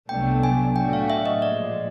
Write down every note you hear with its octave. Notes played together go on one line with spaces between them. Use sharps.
C2 B2 F#3 A3 D4 G5
G#5
A2 F#3 A3 D4 F#4 G5
F5
E5
D#5
A#2 F3 G#3 D5